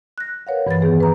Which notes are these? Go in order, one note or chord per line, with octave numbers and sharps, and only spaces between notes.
F#6 A#6
A#4 B4 C#5 F5 F#5
G2 E3 B4 B5 A6
D#3 B3 G#4 B4
B4 A#5